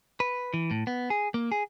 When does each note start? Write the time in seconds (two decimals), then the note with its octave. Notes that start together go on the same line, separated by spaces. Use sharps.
0.20 B4
0.54 E3
0.71 A2
0.87 B3
1.10 G#4
1.34 A#3
1.52 G#4